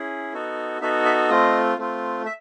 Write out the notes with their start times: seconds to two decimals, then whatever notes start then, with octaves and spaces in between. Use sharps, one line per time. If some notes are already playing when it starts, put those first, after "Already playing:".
Already playing: C#4 E4 G#4
0.33 B3 D#4 F#4 A4
0.81 B3 D#4 F#4 A4 E5
1.05 E5
1.29 A3 C4 F4 D#5
1.78 A3 C4 F4
2.25 E5